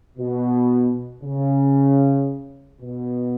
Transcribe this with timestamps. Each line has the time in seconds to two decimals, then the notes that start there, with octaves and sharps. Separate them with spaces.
0.18 B2
1.23 C#3
2.81 B2